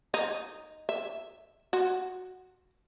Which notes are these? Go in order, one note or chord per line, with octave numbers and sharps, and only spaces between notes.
D#4
E5
F#4